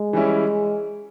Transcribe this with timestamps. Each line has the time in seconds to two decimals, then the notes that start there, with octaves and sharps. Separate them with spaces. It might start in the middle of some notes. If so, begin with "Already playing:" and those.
Already playing: G#3
0.13 E3 G3 C#4 E4